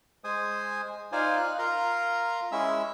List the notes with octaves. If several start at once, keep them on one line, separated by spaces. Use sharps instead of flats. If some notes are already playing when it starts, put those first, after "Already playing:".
G#3 C5 G#5 D#6
D#4 F4 C5 D5 G#5
F5 F#6
F4 A#4 A#5 C6
G#3 C#4 E4 E5 E6